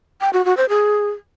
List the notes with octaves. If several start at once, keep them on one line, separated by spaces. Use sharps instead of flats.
G5
F#4
F#4
C5
G#4